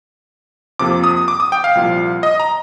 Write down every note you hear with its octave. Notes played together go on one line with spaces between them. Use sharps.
F2 C3 F3 A#3 D6
D#6
D6
D#6
G5
F5
C2 A#2 F3
D#5
A#5